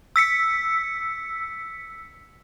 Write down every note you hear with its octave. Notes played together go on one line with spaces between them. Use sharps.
E6 B6 C#7